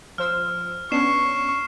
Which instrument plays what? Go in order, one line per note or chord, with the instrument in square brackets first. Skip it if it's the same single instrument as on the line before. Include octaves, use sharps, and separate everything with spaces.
[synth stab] F3 C5 E6 [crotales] F6
[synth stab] B3 C#4 D4 [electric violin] C#6 [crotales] C7 E7